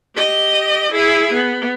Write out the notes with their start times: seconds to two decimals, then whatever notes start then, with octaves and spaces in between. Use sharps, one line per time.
0.16 G4 D#5
0.92 E4 G#4
1.33 B3